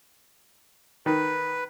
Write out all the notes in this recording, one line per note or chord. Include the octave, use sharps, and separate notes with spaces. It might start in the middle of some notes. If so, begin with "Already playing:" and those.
D#3 B4